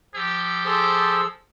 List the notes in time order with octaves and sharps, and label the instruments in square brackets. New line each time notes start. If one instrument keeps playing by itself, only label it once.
[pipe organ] F3 E6 [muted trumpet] G4
[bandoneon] G#4 A4 C5